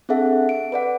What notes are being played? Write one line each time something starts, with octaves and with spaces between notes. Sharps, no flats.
C4 D4 G#4 A4 E5 F#5
D7
B4 D5 F#5